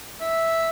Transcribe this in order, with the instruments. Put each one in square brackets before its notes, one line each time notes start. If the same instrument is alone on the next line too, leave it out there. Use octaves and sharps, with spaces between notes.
[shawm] E5